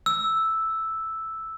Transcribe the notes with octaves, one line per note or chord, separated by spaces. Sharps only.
E6